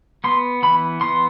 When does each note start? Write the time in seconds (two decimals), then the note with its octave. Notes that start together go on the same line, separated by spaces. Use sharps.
0.24 B3 C6
0.63 E3 B5
1.01 B3 C6